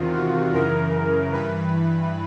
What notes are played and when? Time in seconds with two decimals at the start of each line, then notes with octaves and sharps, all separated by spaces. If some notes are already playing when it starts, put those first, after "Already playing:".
Already playing: E2 C3 D#3 F4
0.13 F#4
0.53 F#2 C#3 E3 A#4
1.32 G2 E3 B4